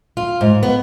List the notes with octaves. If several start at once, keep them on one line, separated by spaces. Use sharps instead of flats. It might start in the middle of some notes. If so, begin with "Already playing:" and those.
F4
G#2
B3